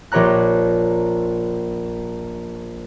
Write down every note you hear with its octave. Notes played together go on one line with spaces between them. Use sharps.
A#1 G4 C#5 A#5 F#6